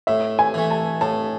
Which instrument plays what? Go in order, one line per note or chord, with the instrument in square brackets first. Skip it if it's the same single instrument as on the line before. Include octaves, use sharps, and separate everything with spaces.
[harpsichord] A2 [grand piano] E5
[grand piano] G#5
[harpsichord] E3 A3
[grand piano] A5
[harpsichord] A2 [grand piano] A5